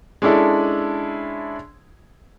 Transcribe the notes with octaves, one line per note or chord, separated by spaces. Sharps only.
G#3 C#4 D4 E4 A4